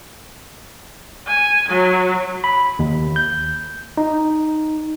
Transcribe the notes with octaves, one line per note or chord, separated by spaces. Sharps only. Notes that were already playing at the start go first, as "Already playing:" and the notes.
G#5
F#3
B5
D#2
G6
D#4